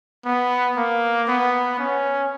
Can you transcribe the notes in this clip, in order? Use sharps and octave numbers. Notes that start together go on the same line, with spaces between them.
B3
A#3
B3
C#4